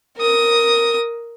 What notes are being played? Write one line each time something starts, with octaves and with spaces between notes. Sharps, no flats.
A#4 D#6